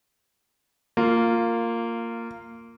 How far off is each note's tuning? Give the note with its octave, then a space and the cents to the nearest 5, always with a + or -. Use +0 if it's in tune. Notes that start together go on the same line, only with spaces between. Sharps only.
A#3 -15 F4 +0